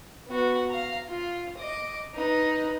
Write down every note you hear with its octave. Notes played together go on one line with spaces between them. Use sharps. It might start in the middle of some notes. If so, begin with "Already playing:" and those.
B3 F#4
F5 A#5
F4
D#5 D6
D#4 B4